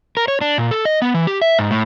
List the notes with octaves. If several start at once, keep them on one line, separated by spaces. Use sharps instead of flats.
A#4
C#5
D4
A#2
A4
D#5
B3
E3
G4
E5
G#2
A2